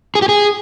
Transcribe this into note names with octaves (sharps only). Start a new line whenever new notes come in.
G#4
G4
G#4